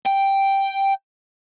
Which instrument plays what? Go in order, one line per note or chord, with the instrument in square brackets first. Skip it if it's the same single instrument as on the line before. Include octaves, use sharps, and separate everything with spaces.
[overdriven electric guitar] G5